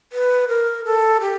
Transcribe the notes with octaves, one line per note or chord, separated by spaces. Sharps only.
B4
A#4
A4
G4